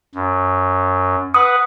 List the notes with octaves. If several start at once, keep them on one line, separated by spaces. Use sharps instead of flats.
F#2
B4 F#5 D#6